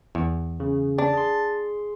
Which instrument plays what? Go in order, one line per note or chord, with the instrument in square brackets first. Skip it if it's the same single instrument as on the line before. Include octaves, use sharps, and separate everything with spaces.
[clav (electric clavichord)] E2
[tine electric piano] C#3
[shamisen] D4 [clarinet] A5
[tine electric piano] G#4 C6